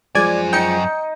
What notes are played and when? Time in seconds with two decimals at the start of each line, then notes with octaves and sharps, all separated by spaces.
0.15 F#2 F3 G#3 D5 G#5 G#6
0.53 D#4 G5 C#7